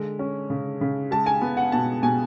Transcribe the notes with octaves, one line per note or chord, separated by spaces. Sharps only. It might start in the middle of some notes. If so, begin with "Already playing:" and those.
Already playing: D3 G#3
C#4
C#3
C#3
G#3 A5
G#5
B3
F#5
B2 A5
B2 G#5